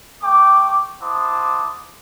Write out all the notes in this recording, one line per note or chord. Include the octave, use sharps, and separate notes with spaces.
A3 G5 C#6 D6
E4 C5 F#5 A5 D6 D#6